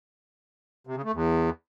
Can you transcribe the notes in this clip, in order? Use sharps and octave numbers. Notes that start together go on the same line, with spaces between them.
C3
C#3
A3
E2